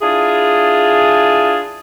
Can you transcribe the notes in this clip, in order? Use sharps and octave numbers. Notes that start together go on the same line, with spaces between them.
D4 E4 F4 G#4